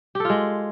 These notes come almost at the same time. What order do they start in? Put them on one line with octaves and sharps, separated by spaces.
G4 A4 F4 G#3